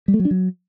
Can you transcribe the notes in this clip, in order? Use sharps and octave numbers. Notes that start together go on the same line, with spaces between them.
G3
A3
F#3
D4
F#3